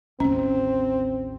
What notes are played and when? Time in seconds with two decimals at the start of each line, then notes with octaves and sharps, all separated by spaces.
0.20 A1 D#2 C4 C#4